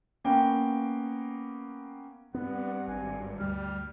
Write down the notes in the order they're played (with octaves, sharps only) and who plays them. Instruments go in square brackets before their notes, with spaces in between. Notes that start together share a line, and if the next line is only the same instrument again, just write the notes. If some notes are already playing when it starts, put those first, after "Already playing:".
[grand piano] A#3 B3 C#4 G5
[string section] G2 [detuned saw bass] B3 [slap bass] C4 [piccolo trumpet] F#5
[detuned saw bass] G#1 [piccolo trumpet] G#5
[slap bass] D2 [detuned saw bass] G3 [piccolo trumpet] F6